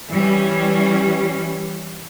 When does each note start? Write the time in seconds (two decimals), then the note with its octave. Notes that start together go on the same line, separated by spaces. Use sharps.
0.11 E3 G3 C#4